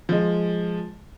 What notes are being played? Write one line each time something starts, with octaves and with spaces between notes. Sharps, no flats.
F3 G#3